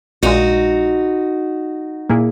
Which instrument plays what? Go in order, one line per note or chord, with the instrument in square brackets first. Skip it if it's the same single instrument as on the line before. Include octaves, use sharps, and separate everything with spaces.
[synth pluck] A#1 A#2 G#3 [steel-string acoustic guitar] D#4 F#4
[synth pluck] A#2 A#3 E4 G#4